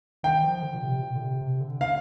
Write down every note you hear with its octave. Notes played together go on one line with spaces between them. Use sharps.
D#3 G5
F3
D3
A#2
C3
A#2
D3
C3
C3
D3
F5